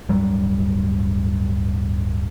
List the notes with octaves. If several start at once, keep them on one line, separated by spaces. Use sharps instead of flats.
D1 G2 F#3 G3